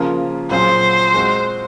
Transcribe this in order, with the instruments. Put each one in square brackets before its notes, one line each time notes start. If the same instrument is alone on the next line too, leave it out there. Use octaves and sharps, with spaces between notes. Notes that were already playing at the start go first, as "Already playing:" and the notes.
Already playing: [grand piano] C#3 F3 A#3 F4
[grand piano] A#2 F#3 C4 F4 G#4 [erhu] C5
[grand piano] G#3 C4 F#4